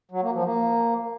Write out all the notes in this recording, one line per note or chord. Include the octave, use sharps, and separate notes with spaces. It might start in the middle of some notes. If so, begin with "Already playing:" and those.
F#3
A#3
F3
A#3